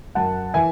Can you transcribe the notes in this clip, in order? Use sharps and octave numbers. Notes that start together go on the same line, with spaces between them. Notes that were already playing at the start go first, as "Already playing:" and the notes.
F#2 F#5 A5
E3 E5 G#5